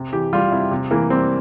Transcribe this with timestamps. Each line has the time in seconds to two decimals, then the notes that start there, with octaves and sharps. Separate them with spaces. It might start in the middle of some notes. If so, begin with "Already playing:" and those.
Already playing: C3
0.13 E3 G4
0.33 G3 F4
0.52 C3 E4
0.71 C3
0.91 E3 A#3
1.10 G3 C4